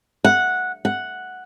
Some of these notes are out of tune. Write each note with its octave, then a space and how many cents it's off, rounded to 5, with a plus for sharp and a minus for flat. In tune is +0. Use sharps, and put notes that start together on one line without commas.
F#5 -10
F#5 +0